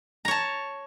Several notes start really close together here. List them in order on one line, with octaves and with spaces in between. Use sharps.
A#5 C#5 A5